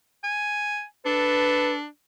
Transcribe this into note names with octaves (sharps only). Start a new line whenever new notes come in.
G#5
D4 A4 B4